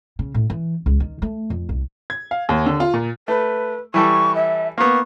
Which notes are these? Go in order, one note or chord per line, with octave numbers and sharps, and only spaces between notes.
C#3
A2
E3
C#2
D#3
A3
F2
C2
G#6
F5
D#2
D3
F4
A#2
A3 B4
E3 G3 A4 C#6
E5
A#3 B3 C#6